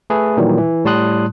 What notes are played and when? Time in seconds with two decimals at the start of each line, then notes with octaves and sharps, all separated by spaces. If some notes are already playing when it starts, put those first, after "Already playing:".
0.10 A3 G#4 A4 B4
0.37 A#2 D#3 E3 F#3 G3
0.58 E3
0.85 A2 G3 A5 C6 D#6 F#6